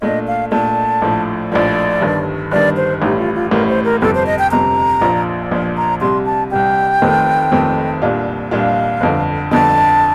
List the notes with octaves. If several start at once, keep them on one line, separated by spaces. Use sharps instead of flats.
A#2 A3 D4 D#5
F5
A#2 A3 D4 A5
A#1 A2 F3
A#1 A2 F3 D5
G1 G2 D#3
G1 G2 D#3 D5
C5
A1 A2 G3 D#4
F4
F4
A1 A2 G3 A#4
C5
A#4
G1 F2 C3 A4
C5
D#5
G5
G1 F2 C3 A#5
A#1 A#2 F3
A#1 A#2 F3
A#5
C2 C3 G3 C6
A5
C2 C3 G3 G5
F1 F2 D#3 A3 C4
F1 F2 D#3 A3 C4
C2 A#2 G3 D4 F4
C2 A#2 G3 D4 F4 F5
G1 F2 D3
G1 F2 D3 A5